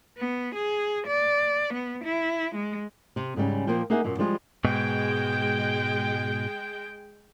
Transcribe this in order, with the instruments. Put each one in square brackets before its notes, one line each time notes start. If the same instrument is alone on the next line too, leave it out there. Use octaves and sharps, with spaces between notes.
[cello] B3
G#4
D5
B3
E4
G#3
[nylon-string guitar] C3
G#2 C#3 G3 C#4
A#2 F3 A#3 G5
A#3 D#4 G#4 E5 F#5
F#2 A#2 A#3
F3 G3 G#3 F4
[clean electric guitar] G#2 B2 [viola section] G#3 G5